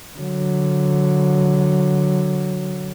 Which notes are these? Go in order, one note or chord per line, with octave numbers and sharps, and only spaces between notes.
D3 F#3